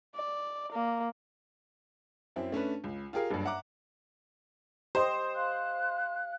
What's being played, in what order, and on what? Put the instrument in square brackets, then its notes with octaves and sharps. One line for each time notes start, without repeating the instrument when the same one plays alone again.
[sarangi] D5
A#3
[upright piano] F#2 C4 E4
A3 C#4 D4 B4
C#2
F4 G4 G#4 A#4 F5
F#1 G2
E5 F#5 A#5 D6
[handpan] G4 D#5 [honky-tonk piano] C5
[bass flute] F5 [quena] F#6